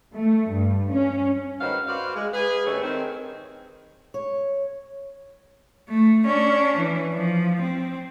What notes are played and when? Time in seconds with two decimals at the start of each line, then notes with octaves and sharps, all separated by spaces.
0.14 A3
0.51 G2
0.92 C#4
1.61 G#2 D#3 F#4 B4 C5 F5
1.87 F#4 B4 C5 D5 F5
2.15 G#3
2.33 G#4 B4
2.66 G2 D#3 A3 C#4 C#5
2.82 D#3 C4
4.14 C#5
5.90 A3
6.25 C#4 D4
6.77 E3
7.14 F3
7.62 C4